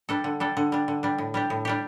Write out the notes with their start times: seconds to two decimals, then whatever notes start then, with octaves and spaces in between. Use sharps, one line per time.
0.09 G3 D4 A4
0.24 D3
0.40 G3 D4 A4
0.57 D3
0.72 G3 D4
0.88 D3
1.03 G3 D4
1.18 A2
1.34 G3 D4 G4
1.50 A2
1.65 G3 D4 G4